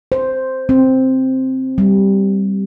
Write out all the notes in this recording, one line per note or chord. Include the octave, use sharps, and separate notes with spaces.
C5
C4
G3